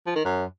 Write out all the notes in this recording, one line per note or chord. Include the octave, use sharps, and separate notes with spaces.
F3
D#3
F#2